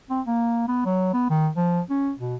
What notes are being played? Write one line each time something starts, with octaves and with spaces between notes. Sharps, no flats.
C4
A#3
B3
F#3
B3
D#3
F3
C#4
B2